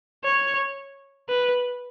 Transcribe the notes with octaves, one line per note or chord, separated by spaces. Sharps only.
C#5
B4